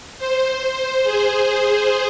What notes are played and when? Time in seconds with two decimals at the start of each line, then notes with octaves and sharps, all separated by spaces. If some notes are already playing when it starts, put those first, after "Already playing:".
0.18 C5
1.04 G#4